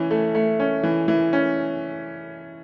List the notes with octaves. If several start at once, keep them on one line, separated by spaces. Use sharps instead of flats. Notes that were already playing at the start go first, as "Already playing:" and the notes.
Already playing: E3 C#4
A3
A3
C#4
E3
E3
C#4